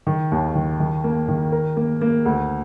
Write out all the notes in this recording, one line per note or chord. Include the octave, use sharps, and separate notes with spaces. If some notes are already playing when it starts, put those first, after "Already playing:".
D#3
D#2
D#3
D#3
A#3
D#3
A#4
A#3
A#3
D2